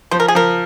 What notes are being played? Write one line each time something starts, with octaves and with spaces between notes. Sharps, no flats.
F3 C5
A#4
G#4
F3 A#4